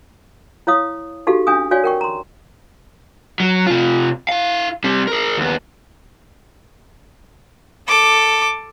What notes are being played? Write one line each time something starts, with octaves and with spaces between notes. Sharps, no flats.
E4 C#5 F5 D#6
D#4 F#4 G4 A4 F5
C#4 D4 F5 G#5 D#6
F#4 C#5 D5 F5 G#5
A#4 G5 C#6
A#5 C6
F#3
C3 F4
E4 F5
G3 C4
G#4 A#4
D#2 B3
A4 D6